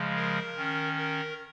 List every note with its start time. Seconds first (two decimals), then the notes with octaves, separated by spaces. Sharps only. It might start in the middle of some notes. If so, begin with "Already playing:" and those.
Already playing: C#3 F3 G#3
0.15 A#4
0.56 D#3 C#4
0.97 A#4